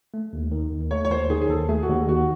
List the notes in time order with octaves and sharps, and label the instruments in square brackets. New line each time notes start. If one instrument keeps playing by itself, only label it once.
[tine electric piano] A3
D#2
D#3
D#2
[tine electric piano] A3 [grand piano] C#5
[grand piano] C#5
[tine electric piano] D#2 [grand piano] C5
[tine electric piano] D#3 [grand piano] G#4
[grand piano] G#4
[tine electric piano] D#2 [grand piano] A4
[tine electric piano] A3 [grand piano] G#4
[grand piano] F#4
[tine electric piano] D#2
[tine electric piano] D#3 [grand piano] F#4